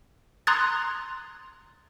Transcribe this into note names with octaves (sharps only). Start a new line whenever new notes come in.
A#5 C6 D#6 F#6 G#6 A6